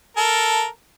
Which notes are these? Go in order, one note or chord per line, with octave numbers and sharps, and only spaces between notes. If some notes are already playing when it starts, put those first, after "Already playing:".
A4 A#4